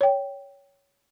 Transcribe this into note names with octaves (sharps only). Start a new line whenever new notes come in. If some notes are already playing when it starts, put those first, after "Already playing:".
C#5 G5